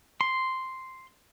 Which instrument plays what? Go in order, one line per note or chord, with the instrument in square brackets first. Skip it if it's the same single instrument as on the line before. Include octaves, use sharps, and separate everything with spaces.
[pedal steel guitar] C6